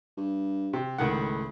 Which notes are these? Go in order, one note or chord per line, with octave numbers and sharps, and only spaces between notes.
G2
C3
C#2 A2 D#3 F#5